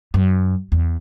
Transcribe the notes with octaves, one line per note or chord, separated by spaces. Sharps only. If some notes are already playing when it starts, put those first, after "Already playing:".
F#2
E2